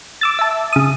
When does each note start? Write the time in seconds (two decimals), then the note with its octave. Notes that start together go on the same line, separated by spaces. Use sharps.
0.21 D6 E6 A6
0.39 E5 A5
0.73 C#3 D#6